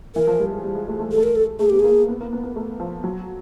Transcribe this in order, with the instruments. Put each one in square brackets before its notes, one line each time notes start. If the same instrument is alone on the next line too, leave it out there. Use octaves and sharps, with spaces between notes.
[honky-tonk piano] E3 [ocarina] A#4
[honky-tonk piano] F3
G3
G#3
G3
G#3
A3
A3
G#3
[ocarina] A4
[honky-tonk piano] A3
[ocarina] A#4
A4
[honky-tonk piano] A3 [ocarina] G#4
[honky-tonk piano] B3 [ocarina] G4
[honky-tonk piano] A#3 [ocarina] G#4
[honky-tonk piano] B3
A#3
B3
B3
A3
F3
F#3